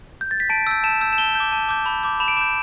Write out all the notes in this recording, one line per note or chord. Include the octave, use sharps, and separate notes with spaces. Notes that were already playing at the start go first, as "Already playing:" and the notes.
G6
A6
B6
A5 D7
E6 G6
A5 E7
E6 G6
E7
A5 G7
D6 G6
A5
D6 G6
B5
D6 G6
B5 E7
D7
D6 G6 E7